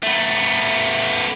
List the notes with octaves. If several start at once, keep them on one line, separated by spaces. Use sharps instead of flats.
A3 B3